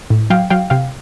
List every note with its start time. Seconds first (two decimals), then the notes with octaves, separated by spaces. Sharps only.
0.10 A2
0.30 F#3 F5 G5
0.50 F#3 F5 G5
0.70 C3 F5 G5